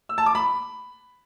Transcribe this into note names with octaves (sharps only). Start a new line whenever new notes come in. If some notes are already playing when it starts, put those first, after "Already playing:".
E6
A5
D6
B5